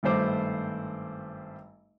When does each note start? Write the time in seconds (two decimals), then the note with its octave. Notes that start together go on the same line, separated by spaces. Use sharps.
0.03 G#1 G2 A3 C5 D6